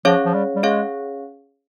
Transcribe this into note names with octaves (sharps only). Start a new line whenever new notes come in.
F3 C#4 G#4 C#5 F5
F3
G3
G3
G#3 C#4 G#4 C#5 F5